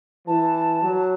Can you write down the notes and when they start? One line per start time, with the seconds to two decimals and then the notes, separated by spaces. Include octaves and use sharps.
0.27 E3 A5
0.83 F#3